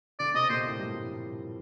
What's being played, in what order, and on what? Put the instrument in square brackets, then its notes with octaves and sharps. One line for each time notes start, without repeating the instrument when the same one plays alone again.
[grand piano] D3 D4 [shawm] D5
[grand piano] C3 C4 [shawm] D#5
[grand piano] A#2 A#3 [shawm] C5
[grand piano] A2 A3
G2 G3
F3